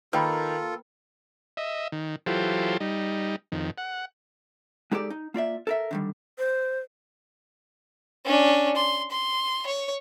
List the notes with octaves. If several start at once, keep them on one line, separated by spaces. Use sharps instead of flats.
D#3 A#3 F4 A4 B4 G5 B5
D#5 E5
D#3
E3 F#3 F4 G4 A4 C5
G3 D#4
F2 D#3
F#5
G#3 D#4 G4 A4 B4 D5
D#4
A#3 F4 D5 E5
A4 A#4 E5
D3 D#3 G3
C5
C#4 D4
C6
C6
C#5